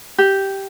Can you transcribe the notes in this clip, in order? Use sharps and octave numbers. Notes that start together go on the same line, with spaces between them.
G4